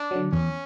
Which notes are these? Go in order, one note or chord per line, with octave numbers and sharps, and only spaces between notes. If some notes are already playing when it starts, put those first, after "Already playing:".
Already playing: D4
D3 F#3
E2 C#4